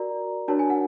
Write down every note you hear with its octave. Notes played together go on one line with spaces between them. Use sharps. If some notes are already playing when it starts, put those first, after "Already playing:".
Already playing: F#4 A#4 D5 A#5
D4 F#4 A#4 C#5 A5
G#5
F#5